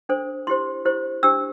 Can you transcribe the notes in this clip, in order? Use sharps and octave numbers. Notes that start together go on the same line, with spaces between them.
D4 A4 C5
E4 G4 C5 C6
E4 G4 C5
D4 G4 C5 E6